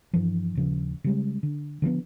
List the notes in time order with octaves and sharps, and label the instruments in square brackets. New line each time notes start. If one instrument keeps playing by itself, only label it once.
[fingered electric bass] G2 E3 F3
D#1 C#3 F3
C#3 G3 G#3
D3
D3 F3 A#3 B3